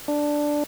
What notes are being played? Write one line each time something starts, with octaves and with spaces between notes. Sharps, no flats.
D4